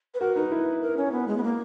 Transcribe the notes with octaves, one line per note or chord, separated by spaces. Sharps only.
B4
F#4 A#4
D#4 B4
E4
A#4
C#4
B3
G#3
B3
A#3